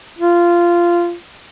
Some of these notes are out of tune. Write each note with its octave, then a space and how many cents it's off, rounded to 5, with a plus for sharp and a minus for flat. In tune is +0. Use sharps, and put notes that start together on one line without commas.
F4 -15